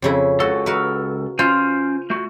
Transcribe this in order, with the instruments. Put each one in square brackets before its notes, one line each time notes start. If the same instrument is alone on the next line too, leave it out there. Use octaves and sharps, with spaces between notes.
[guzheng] F2 C#3 E4
[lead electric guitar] C#2 A4 [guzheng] F#4
[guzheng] F#4 A#4 B4
[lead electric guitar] C#4 C5 [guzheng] F4
[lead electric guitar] A3 F#4